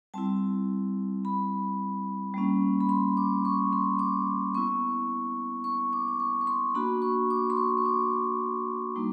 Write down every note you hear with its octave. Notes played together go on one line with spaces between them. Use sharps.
G3 C4 E4 A5
B5
G3 A#3 C#4
B5
C6
D6
C#6
C6
D6
B3 E4 C#6
C#6
D6
D6
C#6
C#6
C6
A#3 D4 F#4 B5
C#6
D6
C6
C#6
C#6
D6
G3 A#3 D#4